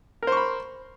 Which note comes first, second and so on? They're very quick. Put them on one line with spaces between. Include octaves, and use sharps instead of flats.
A#4 C5 C#6 B5